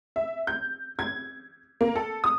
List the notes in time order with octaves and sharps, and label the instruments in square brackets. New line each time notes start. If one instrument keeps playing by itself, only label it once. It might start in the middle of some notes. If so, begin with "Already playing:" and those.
[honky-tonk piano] E5
G6
G#6
A#3
A4
D#6